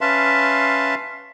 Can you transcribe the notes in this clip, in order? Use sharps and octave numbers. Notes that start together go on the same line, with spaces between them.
C#4 B4 E5 F5 A5 C6